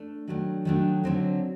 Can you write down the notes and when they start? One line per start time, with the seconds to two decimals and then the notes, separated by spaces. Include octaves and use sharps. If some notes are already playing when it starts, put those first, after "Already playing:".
Already playing: A3 D4
0.28 D#3 F#3 A3 D4
0.65 D#3 F#3 A3 D4
1.04 D3 F#3 C4 D#4